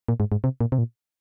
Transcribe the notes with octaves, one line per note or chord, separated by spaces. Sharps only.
A#2
G#2
G#2
C3
A#2
C3
A#2